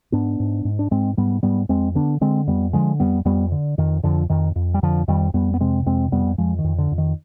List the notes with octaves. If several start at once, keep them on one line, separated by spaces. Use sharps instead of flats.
G#2 B3 D4
G#2
G#2
D4
G#2 G#3 C4
G#2 G3 B3
G#2 G3 B3
F2 G#3 C4
D3 B3 D4
D3 G#3 C4
F2 G3 B3
D3 F3 G#3
F2 G3 B3
F2 G3 B3
D3
F2 D#3
F2 D3 F3
F2 D#3
F2
G3
F2 D3 F3
F2 D#3 G3
F2 G3 B3
B3
C3 G#3 C4
F2 G#3 C4
F2 G3 B3
F2 F3 G#3
D#3
F2
D3
F2
D#3